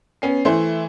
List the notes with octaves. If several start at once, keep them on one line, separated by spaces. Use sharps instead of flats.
B3 C#4 C7
E3 A3 E4 C5